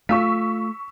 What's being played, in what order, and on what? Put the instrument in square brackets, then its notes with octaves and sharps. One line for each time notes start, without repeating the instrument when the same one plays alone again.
[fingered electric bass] A3 [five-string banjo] F4 [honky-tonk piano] C#6 E6 B6